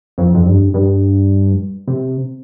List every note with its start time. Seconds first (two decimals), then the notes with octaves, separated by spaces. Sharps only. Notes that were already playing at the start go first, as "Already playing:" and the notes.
0.18 F2
0.35 F2
0.46 G2
0.74 G2
1.88 C3